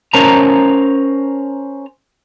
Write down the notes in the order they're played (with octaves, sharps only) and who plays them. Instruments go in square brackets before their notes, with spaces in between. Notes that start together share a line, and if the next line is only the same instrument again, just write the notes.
[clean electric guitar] C#4 A#4 C5 A5 A#5